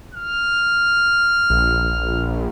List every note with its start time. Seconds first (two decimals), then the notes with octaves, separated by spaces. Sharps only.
0.14 F6
1.50 A#1